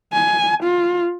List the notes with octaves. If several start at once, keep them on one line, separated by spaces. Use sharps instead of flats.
G#5
F4